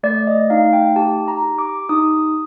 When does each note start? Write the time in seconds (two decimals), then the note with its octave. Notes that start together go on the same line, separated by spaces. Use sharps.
0.03 A3 D5
0.27 D#5
0.50 D#4 F5
0.73 G5
0.96 G4 A5
1.28 A#5
1.43 G4
1.58 D6
1.89 D#4 D#6